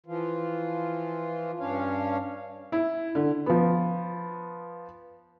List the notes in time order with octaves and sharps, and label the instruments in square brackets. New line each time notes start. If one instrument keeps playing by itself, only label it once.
[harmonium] E3 F3 F4
G2 C#4 D4 C#5 F5
[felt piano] E4
D3
F3 B3